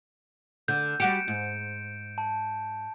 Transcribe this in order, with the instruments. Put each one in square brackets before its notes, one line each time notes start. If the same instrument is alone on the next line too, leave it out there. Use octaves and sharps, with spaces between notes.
[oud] D3 [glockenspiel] G6
[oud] G3 F#4 G4 [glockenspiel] C#7 D7 E7
[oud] G#2
[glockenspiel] A5